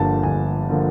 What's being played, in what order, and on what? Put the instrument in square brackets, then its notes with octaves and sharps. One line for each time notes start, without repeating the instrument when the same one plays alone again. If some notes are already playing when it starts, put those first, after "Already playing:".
Already playing: [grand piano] G1 G2 D3 F3 A#3 A5
G1 G#5
D3 F3 A#3